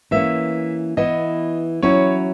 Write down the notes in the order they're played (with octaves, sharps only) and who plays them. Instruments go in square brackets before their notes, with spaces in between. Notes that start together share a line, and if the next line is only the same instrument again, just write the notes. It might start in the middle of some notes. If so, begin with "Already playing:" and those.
[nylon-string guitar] E3 A#3 C#4 [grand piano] E5
[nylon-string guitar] E3 B3 E4 [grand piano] D#5
[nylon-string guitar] F#3 C#4 E4 [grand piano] C#5